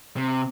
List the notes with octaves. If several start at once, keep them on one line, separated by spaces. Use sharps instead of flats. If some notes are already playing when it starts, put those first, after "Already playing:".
C3